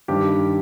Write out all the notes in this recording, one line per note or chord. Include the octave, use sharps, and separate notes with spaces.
G2 D#3 G3 G4